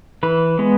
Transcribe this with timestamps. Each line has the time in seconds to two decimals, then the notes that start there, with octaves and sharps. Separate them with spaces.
0.23 E3 B4
0.59 G#3 B3